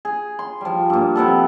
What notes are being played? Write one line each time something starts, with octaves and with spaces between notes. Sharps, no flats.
G#4
C6
F3 G3
G2 A#2
C3 F3 B3 A4